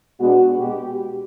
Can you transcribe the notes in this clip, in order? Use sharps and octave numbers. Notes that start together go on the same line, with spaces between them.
B2 G#3 B3 D4 F#4
B2 G#3 B3 G4